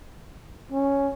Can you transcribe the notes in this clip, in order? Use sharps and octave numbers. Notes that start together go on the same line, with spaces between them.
C#4